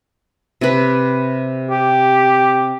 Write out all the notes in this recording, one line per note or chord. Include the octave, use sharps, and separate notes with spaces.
C3 B4
G4